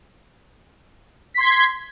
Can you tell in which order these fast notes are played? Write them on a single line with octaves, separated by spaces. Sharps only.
B6 C6 G#6